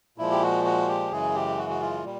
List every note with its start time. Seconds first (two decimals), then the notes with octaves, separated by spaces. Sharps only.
0.18 A#2 F3 G#3 E4
0.31 G4
0.42 F#4
0.64 F#4
0.88 G4
1.11 F#2 C#3 E3 G#3 G#4
1.35 G4
1.58 F#4
1.70 F#4
1.80 F4
2.04 A#2 G3